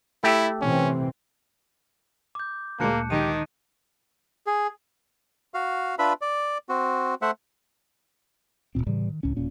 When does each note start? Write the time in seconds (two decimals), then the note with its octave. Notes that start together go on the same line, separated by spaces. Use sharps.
0.24 A3 E4 G4 A4
0.62 C3 E3 C4 C#4
2.35 D6 G6
2.80 D2 A#2 G#3 A#3 A5 F#6 C#7
3.11 D#3 G4 D#7
4.47 G#4
5.54 F#4 F5
5.99 D4 F4 B4 E5 B5
6.21 D5
6.69 C4 F#4
7.22 A3 C5 E5 F#5
8.75 D#1 C#2 A#2 C4
8.87 A2 C#3 E3 G3
9.09 D#3
9.23 C#2 A2 C#4
9.37 E1 A#2 C#4